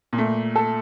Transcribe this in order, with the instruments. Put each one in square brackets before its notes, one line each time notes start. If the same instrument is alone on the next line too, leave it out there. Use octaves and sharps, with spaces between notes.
[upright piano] A#2
A3
A4